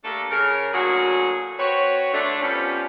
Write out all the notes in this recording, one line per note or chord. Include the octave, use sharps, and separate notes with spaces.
A3 A#3 D4 G4 A4
C#3 A#4
A2 D3 F#3 A#3 F#4 G#4
C4 F#4 B4 C#5
D3 A3 D4
C3 F3 G3 B3 C#4